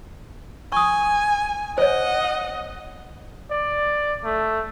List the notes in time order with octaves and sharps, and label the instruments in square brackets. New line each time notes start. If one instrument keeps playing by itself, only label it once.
[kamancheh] G#5 [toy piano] C#6 D#6
[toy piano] C5 C#5 [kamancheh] D#5 F#5
[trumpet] D5
A3